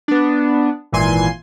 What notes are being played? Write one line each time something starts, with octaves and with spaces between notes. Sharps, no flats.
B3 D4
G#1 A#2 E3 G#5 C6